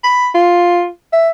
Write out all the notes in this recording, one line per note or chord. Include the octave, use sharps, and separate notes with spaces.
B5
F4
E5